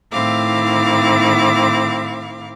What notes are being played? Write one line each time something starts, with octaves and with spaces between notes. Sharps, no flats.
A2 D#3 C4 E4 F5 D6